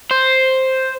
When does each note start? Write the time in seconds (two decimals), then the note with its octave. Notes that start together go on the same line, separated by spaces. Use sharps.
0.11 C5